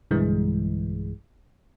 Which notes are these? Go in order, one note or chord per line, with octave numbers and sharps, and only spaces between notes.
B1 G2 D3 E3 G#3